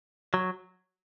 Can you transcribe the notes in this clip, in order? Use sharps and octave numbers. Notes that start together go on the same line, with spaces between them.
F#3